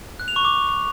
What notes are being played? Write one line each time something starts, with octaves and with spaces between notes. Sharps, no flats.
F#6
F7
C#6
D6